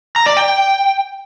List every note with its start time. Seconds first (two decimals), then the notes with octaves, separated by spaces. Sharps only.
0.16 A#5
0.26 D5
0.37 G5